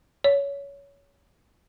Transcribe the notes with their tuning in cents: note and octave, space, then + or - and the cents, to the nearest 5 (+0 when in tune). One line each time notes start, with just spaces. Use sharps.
C#5 +20